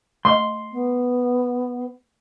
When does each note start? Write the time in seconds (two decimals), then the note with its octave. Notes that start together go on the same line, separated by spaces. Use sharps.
0.25 A3 D#5 C6
0.72 B3